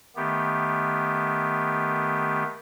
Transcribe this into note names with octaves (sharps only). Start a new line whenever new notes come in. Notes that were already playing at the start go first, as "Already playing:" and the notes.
D#3 A3 B3 G4